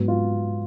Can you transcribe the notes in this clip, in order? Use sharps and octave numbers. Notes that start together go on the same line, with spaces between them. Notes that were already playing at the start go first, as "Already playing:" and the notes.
Already playing: G#2 F#3 B3
F4